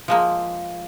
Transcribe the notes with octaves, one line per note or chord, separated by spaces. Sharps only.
F3 G#3 A#3